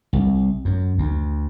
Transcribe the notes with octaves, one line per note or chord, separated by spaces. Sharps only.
C2
F#2
D2